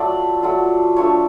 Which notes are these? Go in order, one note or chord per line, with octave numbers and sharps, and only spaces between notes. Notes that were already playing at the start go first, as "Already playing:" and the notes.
Already playing: F#3 A3 F4 D5
F#3 A3 F4
F3 A3 D4 F4 C#5